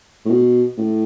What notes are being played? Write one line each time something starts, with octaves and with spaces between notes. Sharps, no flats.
A2
B2
A2